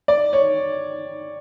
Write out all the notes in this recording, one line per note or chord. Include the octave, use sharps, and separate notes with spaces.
D5
C#5